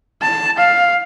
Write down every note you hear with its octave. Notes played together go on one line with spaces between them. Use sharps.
A5
F5